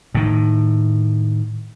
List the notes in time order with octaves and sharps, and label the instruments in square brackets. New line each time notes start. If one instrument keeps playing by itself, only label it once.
[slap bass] A2 D#3